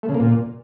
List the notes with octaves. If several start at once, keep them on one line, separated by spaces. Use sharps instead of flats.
A3
C#3
A#3
A#2